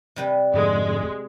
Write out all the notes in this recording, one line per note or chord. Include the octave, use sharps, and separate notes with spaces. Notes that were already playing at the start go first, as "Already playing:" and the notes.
C3 G3 B4
F2 G#2 D3 G#3